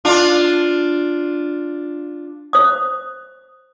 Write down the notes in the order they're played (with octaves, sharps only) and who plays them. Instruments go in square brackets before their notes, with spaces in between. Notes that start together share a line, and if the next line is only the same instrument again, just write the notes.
[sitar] D4 F4
[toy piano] C5 D#6